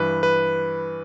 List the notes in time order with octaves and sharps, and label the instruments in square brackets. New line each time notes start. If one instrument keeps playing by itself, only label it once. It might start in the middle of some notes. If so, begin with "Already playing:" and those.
Already playing: [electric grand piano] G2 E3 B4
B4